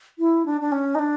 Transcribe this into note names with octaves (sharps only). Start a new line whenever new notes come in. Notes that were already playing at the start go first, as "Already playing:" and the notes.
E4
D4
D4
C#4
D#4
D4